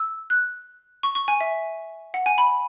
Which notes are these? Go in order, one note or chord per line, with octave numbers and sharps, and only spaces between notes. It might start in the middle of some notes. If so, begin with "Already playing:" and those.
Already playing: E6
F#6
C#6
C#6
G#5
E5
F#5
G#5
B5